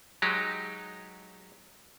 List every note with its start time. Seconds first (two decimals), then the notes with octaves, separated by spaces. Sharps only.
0.22 F#3 G#3 D#4 G4